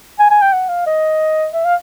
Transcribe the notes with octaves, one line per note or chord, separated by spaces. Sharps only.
G#5
G#5
G5
F#5
F5
D#5
E5
F5